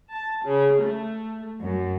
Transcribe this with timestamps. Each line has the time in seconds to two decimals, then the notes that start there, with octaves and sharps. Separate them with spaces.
0.13 A5
0.45 C#3
0.82 A3
1.61 F#2